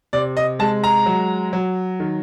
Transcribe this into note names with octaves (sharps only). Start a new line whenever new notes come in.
C3 D5
D#5
G#3 A5
A#5
F#3
F#3
D#3